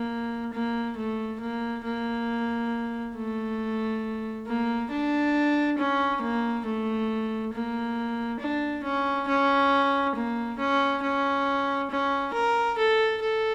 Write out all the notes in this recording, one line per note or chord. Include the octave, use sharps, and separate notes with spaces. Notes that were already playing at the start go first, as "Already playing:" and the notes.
Already playing: A#3
A#3
A3
A#3
A#3
A3
A#3
D4
C#4
A#3
A3
A#3
D4
C#4
C#4
A#3
C#4
C#4
C#4
A#4
A4
A4